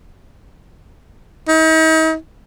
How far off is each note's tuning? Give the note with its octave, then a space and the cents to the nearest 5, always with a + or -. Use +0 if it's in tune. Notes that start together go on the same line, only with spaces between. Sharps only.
D#4 +40